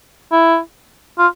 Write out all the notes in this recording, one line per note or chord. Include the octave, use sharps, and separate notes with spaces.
E4
F4